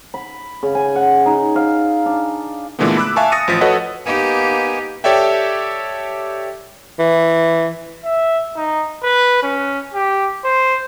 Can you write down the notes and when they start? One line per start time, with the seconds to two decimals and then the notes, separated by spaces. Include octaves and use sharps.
0.14 B5
0.63 C#3
0.75 G#5
0.95 F#5
1.26 D#4
1.56 F5
2.06 D4
2.79 A#2 D3 E3 G#3 A3 B3
2.97 B5 D6 E6 F#6
3.16 E5 F5 G#5 A5 C#6 D6
3.32 D#6 A6 A#6 C#7 D#7
3.48 A1 F3 B6
3.61 F#4 A4 B4 C#5 D#5 F#5
4.06 A#3 B3 D#4 G4 G#5
5.04 G4 A4 C#5 D5 E5 G5
6.99 E3
8.04 E5
8.56 D#4
9.03 B4
9.43 C#4
9.94 G4
10.44 C5